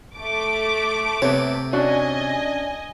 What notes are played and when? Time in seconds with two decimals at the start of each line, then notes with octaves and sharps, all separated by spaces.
0.16 A3 D6
1.22 C3 B3 C#5
1.73 C#4 D4 F#4 D#5 G#5